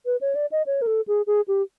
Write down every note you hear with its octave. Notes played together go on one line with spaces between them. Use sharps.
B4
C#5
D5
D#5
C#5
A#4
A4
G#4
G#4
G4